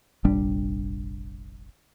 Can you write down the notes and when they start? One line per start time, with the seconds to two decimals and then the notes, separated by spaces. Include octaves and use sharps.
0.25 F1 A#1 G3 D4